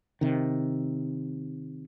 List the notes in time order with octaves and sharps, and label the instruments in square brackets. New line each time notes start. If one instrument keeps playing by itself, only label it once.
[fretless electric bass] C3 D#3